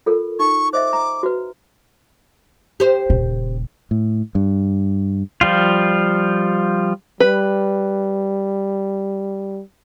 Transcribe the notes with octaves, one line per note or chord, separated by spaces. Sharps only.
F4 A4 A#4
D#4 C#6
C5 D#5 E5 D6
A#5
F#4 B4
G4 C5
D#1 C#3
A2
G2
F3 G3 F4
G3 B4